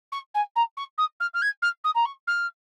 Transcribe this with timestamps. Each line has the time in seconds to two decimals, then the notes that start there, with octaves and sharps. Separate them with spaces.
0.12 C#6
0.34 G#5
0.55 A#5
0.77 C#6
0.98 D#6
1.20 F6
1.33 F6
1.42 G#6
1.62 F6
1.84 D#6
1.94 A#5
2.05 C#6
2.27 F6